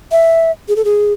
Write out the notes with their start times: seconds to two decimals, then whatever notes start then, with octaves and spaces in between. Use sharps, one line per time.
0.12 E5
0.68 G#4
0.76 A4
0.85 G#4